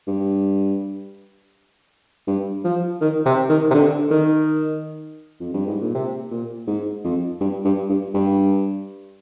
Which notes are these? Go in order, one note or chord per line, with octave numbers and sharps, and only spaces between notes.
G2
G2
F3
D#3
C3
D#3
C3
D3
D#3
F2
G2
G#2
A#2
C3
A#2
G#2
F2
G2
G2
G2
G2